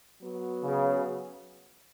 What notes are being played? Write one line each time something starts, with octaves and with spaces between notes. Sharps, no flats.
F#3 B3 F#4
C#3